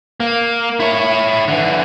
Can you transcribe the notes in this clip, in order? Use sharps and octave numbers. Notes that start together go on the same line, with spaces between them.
A#3
E4 C#5
D3 E3